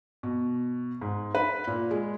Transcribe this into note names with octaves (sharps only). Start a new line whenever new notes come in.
B2
G#2
B4
A#2
G#3